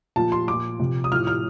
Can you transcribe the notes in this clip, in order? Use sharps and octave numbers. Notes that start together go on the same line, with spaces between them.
A#2 F3 A5
C6
A#2 F3 D6
C3 F3
D#6
A2 F3 F6
F6